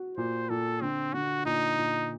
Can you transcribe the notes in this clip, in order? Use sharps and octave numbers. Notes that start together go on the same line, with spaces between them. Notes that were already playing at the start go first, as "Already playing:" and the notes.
Already playing: F#4
A#2 C5
A#2 A4
D3 C4
D3 F#4
A#2 D#4
A#2